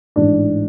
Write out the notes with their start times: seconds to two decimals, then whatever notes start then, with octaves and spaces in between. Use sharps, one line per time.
0.16 A1 G#2 E3 D4